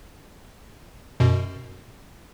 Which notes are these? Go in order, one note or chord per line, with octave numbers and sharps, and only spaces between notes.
F#2 B2